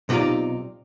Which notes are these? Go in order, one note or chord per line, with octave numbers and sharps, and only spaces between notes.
B1 C3 B3 D#4 F4 D5